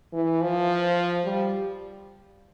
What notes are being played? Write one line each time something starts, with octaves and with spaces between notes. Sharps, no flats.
E3
F3
G3